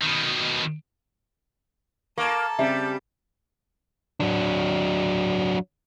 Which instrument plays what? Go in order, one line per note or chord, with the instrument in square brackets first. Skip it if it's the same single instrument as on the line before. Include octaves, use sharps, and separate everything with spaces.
[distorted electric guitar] B2 D#3
[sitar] A#3 [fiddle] A4 A5 [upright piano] C#6 D6 G#6
[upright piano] C#3 C4 [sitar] G3 [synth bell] E5
[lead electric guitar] F#3 D4